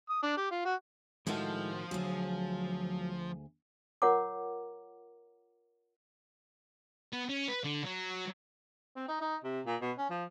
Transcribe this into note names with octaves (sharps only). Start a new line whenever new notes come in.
D#6
D4
G4
F4
F#4
A2 D#3 F3 G#3 E4 F#4 A4
D2 F#3 G#4
F4 A#4 C#5 F#5 A#5 D6
B3
C#4
B4
D3
F#3
C4
D#4
D#4
C3
A#2
B2
C#4
F3